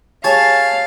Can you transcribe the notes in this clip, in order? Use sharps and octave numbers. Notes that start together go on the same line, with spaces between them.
G4 G#4 C#5 F5 G#5 A5